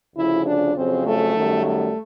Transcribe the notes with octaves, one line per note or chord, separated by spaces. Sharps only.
D2 C#3 F3 E4
D4
F2 C#3 F#3 C4
A3
F#2 D#3 G3
A3